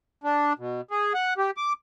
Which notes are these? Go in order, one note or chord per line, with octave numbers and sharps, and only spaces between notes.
D4
B2
G#4
F#5
G4
D6